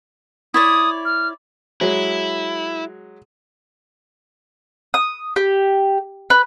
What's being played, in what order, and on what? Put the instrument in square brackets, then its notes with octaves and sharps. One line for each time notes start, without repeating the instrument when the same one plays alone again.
[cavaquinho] E4 C#5 D5 [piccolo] D#6
[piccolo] F6
[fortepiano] F#3 G#3 [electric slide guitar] E4
[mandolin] D#6
G4
B4